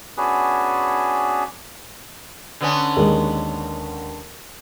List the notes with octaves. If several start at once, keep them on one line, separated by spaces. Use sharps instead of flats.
B3 C#4 D4 F#4 G#4 B4
D3 B3 C#4
D#2 G#3